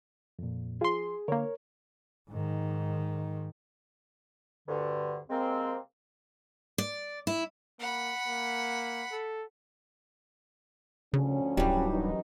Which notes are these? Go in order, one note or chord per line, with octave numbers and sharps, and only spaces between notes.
F2 A#2
F3 G#4 C6
D3 A#3 A#4 C#5
G#2 D#3
D2 G2 D3
C3 G#3 A#3 C4
D5
E4
A#3 F#5 B5
A#3
A4
D2 C#3 F3 C#4
D1 G2 F#3 G3 E4 G4
F#2 E3 D#4